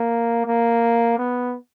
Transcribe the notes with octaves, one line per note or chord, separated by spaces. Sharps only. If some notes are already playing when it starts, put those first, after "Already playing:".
Already playing: A#3
A#3
B3